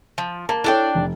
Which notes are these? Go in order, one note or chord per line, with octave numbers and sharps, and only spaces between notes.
F3
A#3 A5
D4 E4 A4 C#5 D5 G5
F1